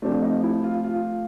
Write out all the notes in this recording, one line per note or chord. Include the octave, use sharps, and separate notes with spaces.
C3 F3 A3 D4
D#4
E4
F4
F4